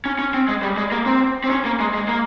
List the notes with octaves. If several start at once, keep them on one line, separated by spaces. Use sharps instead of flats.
C#4
C#4
C4
G#3
G3
G#3
A#3
C4
C4
C#4
A#3
G#3
G#3
A#3